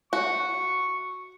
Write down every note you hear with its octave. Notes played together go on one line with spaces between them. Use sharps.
F#4 C#6